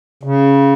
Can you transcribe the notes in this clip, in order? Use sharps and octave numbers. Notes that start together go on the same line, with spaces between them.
C#3